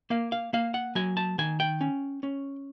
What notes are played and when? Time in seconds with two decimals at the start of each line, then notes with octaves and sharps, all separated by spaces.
0.10 A#3 F5
0.32 F5
0.53 A#3 F5
0.74 F#5
0.95 F#3 G#5
1.17 A5
1.38 D#3 G#5
1.60 G5
1.81 C#4
2.23 C#4